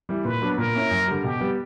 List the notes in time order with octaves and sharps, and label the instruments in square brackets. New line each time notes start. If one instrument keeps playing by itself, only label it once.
[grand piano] E3 G3
[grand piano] A#2 [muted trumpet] B4
[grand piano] F#3 B3 D4
[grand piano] A#2 [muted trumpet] A#4
[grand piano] A#3 C#4 E4
F#2
D3 G3
[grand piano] B2 [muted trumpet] G4
[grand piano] G3 B3